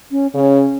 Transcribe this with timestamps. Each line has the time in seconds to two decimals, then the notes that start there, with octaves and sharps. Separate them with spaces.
0.11 C#4
0.34 C#3 C#4